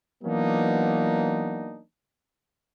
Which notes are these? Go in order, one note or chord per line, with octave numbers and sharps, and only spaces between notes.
E3 F#3 A#3 B3 D4 D#4